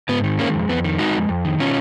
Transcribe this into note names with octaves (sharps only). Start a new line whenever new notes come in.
G#2 B3
D#3
G#3 A#3 C#4
F2
F2 B3
D#3
G#3 D#4 F#4
F2
F2
D#3
B2 C#4 F4